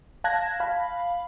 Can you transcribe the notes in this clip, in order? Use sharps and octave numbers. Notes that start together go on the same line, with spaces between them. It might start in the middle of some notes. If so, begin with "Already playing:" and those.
F5 A5 F#6 G#6 A#6
F5 B5